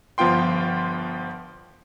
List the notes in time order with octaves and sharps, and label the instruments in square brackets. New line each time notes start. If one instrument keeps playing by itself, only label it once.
[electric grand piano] G1 F3 B3 F4 G5 C6